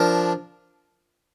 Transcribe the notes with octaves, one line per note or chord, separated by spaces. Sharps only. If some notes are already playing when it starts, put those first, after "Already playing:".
Already playing: F3 D4 A#4